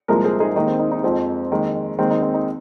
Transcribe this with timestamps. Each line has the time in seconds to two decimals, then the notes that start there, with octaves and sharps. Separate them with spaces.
0.08 C2 A#2 F3 G#3 A#4 D#5
0.24 G#4 C5
0.40 D#4 G#4
0.56 D#2 D#3 G#3 D#4
0.68 C4
0.79 D#4
0.92 D#4
1.03 F2 F3 G#3 C4
1.51 D#2 D#3 G#3
1.99 D#2 D#3 G#3 C4
2.11 D#4
2.22 C4
2.34 D#4